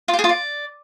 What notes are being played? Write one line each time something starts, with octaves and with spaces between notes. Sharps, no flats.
F4
G4
G#4
F4
D5